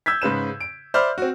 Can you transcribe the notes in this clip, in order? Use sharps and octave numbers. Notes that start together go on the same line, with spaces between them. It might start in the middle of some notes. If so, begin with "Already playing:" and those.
E6 G6 G#6 B6
G#2 C#3 B4 E7
D7
C5 D5 E5 B5 F6
C4 F#4